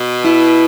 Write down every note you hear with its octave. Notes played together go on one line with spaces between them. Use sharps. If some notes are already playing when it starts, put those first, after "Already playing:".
Already playing: B2
E4